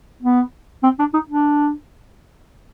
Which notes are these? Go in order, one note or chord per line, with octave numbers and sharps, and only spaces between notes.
B3
C4
D4
D#4
D4